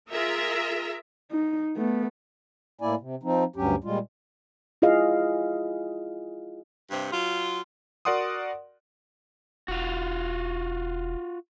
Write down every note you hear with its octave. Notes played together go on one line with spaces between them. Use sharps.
F4 G#4 A#4 E5 A#5
D#4
A3 B3
A2 A#3 E4 D5 G#5
C3
F3 C4 D#4
D2 G2 F#3 C#4 G4
A#2 G3 G#3 F4
E4 F4 G#4 D#5 F5
G2 C3
F#3 F4
F#4 A#4 D5 F#5 C6 D#6
E1 F4 F#4